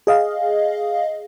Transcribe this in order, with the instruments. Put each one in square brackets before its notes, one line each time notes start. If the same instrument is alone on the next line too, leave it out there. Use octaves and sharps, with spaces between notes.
[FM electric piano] G#4 D#5 F5